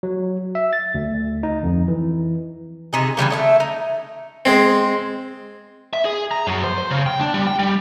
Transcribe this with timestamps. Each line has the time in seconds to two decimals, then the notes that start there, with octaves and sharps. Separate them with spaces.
0.03 F#3
0.55 E5
0.73 A6
0.95 D2
1.43 D#4
1.63 F2
1.88 E3
2.93 C3 D#4 G#4
3.17 E3 F3 G3 A#3
3.30 A3 D#5 E5
3.60 D#4
4.45 G#3 C4
5.93 E5
6.05 G#4
6.31 A#5
6.47 F#2
6.64 C5
6.78 C5
6.91 C#3
7.06 G5
7.21 D4
7.34 G3
7.47 G5
7.59 G3